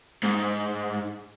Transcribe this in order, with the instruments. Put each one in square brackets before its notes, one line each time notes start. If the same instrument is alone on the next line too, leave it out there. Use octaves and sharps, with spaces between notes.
[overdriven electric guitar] G#2